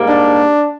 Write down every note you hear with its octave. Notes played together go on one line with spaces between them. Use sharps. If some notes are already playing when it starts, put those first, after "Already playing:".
Already playing: G#2 G3 A#3
D4